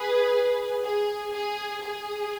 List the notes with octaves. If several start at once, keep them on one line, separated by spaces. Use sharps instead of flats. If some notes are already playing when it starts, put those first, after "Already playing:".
Already playing: G#4 B4
G#4
G#4
G#4